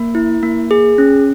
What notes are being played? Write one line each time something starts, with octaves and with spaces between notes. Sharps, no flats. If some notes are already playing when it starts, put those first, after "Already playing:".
Already playing: A#3
E4
A#3
G#4
C#4